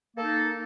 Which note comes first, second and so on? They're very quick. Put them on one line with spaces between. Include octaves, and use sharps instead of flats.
A#3 A4 D#4